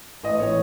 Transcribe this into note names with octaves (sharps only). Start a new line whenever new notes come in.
A1 D#5
A2 E3 C#5